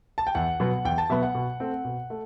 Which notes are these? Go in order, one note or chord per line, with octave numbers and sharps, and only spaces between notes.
A5
G5
E2 F#5
B2 F#3 B3
E2 G5
A5
B2 F#3 B3 E5
F#5
B2
A3 C4
B2
A3